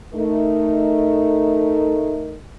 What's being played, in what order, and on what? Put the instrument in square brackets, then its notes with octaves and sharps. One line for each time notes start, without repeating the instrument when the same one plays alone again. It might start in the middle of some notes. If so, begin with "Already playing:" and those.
[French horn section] A3 D#4 A#4